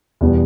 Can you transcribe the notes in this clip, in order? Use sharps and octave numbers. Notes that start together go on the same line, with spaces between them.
E2 B2 G3 B3